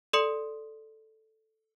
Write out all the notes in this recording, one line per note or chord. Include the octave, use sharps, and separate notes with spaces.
A4 D5 C6 D#6 C#7